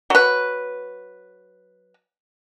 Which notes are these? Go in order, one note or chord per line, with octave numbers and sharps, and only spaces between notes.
F#3 B4